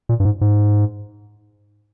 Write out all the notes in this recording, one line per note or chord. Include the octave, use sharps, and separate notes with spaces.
A#2
G2
G#2
G#2